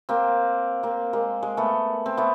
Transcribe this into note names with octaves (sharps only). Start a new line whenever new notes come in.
A#3 C4
A#3 C4
G#3 A#3
G#3
A3 B3
C4
A3 B3